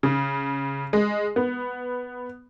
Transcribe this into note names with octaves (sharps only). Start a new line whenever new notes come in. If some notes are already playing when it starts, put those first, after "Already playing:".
C#3
G#3
B3